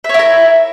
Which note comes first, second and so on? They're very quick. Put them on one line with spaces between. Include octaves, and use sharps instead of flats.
E5 C#5 E4 A#4